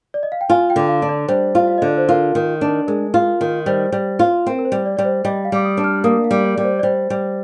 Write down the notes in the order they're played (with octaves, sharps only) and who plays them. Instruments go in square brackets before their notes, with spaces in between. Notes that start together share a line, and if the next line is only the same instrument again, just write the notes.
[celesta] D5
D#5
F5
G5
[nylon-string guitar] F4 [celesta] G#5
[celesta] G5
[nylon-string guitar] D3
[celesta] F5
[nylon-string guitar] D4
[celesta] D5
[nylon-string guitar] G3 [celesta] C5
[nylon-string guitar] F4
[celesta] F5
[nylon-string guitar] D3 [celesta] D#5
[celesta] D5
C5
[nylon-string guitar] F4 [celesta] A#4
[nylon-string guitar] D#3
D4
[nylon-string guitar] G#3 [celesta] A#4
[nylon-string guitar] F4
D#3
[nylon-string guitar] G3 [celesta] C5
[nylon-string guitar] G3
F4
[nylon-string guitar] C4 [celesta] A#4
[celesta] A#4
C5
[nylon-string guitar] G3
[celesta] D5
[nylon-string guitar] G3 [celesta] D5
[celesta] C5
[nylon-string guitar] G3 [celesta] D#5
[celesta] F5
[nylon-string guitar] G3 [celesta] D6
[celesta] D#6
[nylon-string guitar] D4
[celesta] F6
[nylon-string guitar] A#3 [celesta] D#6
[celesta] F5
[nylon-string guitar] G3
[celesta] D5
[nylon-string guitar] G3 [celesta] D5
[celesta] C5
D5
[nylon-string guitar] G3 [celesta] C5
[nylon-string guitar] G3